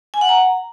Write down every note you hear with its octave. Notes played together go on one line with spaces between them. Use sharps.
G#5
F#5
A#5